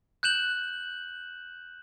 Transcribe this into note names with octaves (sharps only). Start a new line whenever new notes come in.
F#6 G6 E7 F#7